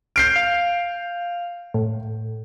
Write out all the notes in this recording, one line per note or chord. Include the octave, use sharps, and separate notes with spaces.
F6 G6 C7 D7
F5
A2